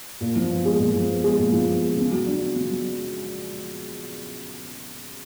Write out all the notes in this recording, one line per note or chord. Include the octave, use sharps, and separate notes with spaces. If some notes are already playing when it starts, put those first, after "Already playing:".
A#2
F3
B3
G#3
A#2
F3
B3
G#3
A#2
F3
B3
G#3
C#3
F#3
D4
B3
C#3
F#3